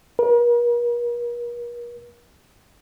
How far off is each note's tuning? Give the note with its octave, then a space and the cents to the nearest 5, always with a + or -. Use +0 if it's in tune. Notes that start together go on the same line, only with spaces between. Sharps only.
A#4 +45